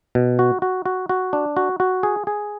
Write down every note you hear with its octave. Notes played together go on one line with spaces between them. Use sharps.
B2
F#4
F#4
F#4
F#4
D4
F#4
F#4
G#4
G#4